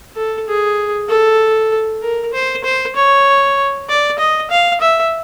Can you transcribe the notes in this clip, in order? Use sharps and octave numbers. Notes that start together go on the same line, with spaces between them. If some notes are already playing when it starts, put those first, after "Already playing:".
A4
G#4
A4
A#4
C5
C5
C#5
D5
D#5
F5
E5